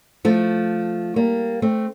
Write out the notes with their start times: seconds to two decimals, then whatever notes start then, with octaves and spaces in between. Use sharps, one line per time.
0.25 F3 A3
1.16 G3 A#3
1.62 A3 C4